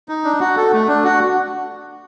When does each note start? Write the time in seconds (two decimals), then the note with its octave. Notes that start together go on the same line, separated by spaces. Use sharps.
0.09 D#4
0.24 D4
0.40 F#4
0.57 A4
0.72 A3
0.88 D4
1.04 F#4